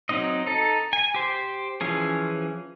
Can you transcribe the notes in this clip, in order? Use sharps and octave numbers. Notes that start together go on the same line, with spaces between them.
F#3 C4 D#4 D#5
D#4 A4
G#5
G4 C5
E3 F3 C#4 G#4